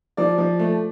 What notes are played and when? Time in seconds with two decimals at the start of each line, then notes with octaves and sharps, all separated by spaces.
0.17 F3 D5
0.38 F3
0.59 A3